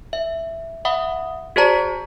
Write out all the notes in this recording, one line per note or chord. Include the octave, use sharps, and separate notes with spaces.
E5
E5 F#5 B5 D#6
F#4 G#4 C5 D5 A5 A#5